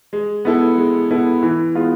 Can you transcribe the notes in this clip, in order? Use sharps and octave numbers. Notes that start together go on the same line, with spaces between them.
G#3
B3 E4 A4
G#3
B3 E4 A4
E3
G#3 B3 F4